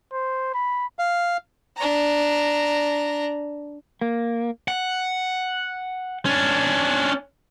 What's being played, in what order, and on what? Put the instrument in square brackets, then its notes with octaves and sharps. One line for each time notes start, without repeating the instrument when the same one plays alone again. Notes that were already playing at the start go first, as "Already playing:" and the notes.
[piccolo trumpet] C5
B5
[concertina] F5
[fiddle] D4 A#5
[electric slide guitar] A#3
[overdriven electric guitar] F#5
C#4 D4